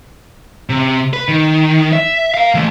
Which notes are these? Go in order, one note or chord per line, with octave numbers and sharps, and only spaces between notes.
C3
B4
D#3
E5
A#4 F5
E3 A3